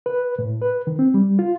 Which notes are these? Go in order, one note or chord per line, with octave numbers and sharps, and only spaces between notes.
B4
A2
B4
D#3
C4
G3
F4